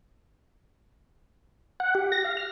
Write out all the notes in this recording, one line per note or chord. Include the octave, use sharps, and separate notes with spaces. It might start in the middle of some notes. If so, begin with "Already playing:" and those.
F#5
G4
A#6
F5
F6